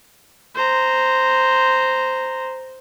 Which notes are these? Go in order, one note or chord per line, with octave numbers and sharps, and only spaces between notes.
C5 A#5